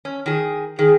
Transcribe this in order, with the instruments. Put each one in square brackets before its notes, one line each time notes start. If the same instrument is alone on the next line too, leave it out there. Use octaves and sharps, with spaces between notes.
[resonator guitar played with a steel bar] C#4
D#3 G#4
[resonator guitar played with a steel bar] D#3 [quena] G#4